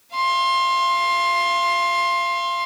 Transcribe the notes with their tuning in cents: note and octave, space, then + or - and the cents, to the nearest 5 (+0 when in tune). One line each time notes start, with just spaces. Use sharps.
F5 -30 C6 +20